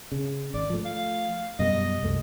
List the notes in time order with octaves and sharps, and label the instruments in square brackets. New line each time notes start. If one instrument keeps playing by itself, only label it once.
[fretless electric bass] C#3
[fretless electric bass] G#1 [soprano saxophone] D5
[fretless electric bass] F3 A3
[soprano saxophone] F5
[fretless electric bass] F#2 B2 G3 [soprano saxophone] D#5
[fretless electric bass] C2 F#2 A3